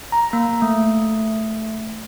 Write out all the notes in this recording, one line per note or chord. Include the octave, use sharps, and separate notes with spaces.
A#5
A#3
A3